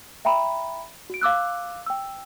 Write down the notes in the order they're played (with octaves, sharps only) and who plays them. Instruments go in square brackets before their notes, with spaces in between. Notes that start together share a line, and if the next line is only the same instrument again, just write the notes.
[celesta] E5 G5 A#5 B5
F#4 D7
F5 D6 E6 F#6
G5 E6